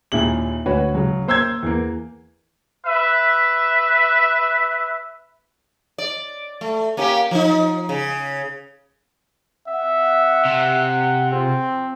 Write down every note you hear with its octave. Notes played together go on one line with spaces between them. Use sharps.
D#2 A#2 E4 G#4 F#7
D2 F#4 B4 C#5
C#3 F#3
A#3 C5 E6 G6 G#6
E2 A#3
B4 E5
D5
A3
A#3 C#4 G4
F3 D#4
C#3
C4 E5 F#5
C3
C4 F4 G#4
F3